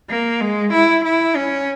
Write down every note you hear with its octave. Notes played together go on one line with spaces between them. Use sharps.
A#3
G#3
E4
E4
C#4